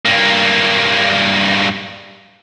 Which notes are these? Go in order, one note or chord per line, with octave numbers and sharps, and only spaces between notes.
G2 A#3